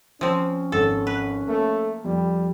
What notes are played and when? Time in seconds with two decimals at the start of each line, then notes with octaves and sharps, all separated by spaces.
0.21 F3 C4 C#4
0.72 G#1 A4
1.07 B4
1.48 A3 A#3
2.05 F2 G3